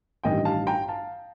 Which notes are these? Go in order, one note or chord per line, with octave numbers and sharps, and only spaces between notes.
A1 G2 D#3 D#5 G5
F5 A5
G5 A#5
F5 A5